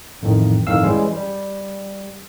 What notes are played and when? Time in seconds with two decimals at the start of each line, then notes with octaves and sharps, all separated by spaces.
0.22 A1 F2 A2 D#3
0.67 G1 F2 A2 D#3 F5 E6
0.83 E3 G3 G#3 C#4
1.12 G3